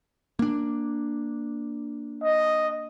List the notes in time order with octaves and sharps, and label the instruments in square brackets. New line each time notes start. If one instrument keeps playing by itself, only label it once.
[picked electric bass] A#3 D4
[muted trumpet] D#5